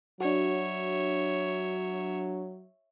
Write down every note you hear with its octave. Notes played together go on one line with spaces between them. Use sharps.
F#3 D4 F#4 C#5 E5